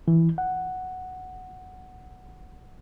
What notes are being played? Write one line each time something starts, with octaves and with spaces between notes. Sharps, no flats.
E3
F#5